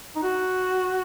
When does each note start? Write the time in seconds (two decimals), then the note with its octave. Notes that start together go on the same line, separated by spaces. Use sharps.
0.16 D#4
0.23 F#4